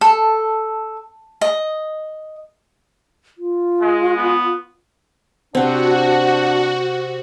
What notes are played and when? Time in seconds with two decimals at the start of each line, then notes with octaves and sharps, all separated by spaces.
0.01 A4
1.41 D#5
3.38 F4
3.80 G#3
4.17 B3
5.55 C3 C4 D4 F#4 F#5